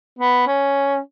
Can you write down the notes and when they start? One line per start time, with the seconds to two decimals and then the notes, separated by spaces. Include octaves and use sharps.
0.19 B3
0.47 C#4